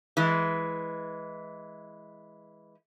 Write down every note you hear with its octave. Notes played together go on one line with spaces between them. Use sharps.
E3 G#3